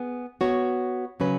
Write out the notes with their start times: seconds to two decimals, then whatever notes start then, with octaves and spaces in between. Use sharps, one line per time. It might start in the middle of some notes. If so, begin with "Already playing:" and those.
Already playing: B3 G#4
0.41 B3 F#4 C#5
1.20 C#3 F#3 C#4 B4